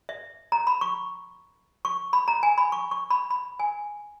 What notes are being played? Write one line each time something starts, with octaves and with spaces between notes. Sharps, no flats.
E5
A#5
B5
C#6
C#6
B5
A#5
G#5
B5
C#6
C#6
B5
B5
G#5